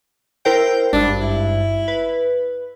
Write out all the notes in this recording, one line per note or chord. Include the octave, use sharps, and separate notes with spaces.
E4 A#4 C5 G5
G#1 G2 D4
E4
B4